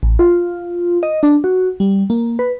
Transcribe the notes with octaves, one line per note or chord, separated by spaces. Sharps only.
A1
F4
D#5
D4
F#4
G3
A#3
B4